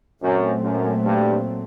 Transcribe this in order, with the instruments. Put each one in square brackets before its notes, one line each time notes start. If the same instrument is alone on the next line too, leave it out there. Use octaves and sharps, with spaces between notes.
[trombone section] F#2 [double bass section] A#2 F#3 A3 C4
[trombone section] F#2
G2